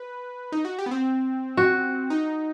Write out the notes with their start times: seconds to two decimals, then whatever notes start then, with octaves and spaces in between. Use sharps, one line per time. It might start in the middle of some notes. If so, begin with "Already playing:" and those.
Already playing: B4
0.52 D#4
0.65 F#4
0.79 G4
0.86 B3
0.91 C4
1.57 F#4
2.10 D#4